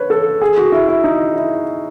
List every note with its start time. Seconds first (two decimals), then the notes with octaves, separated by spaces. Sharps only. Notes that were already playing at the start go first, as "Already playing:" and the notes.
Already playing: B4 C#5
0.10 A4
0.42 G#4
0.58 F#4
0.72 E4
0.88 E4
1.04 D#4
1.36 E4